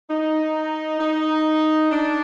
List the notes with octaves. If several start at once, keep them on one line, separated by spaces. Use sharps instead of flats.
D#4
D#4
D4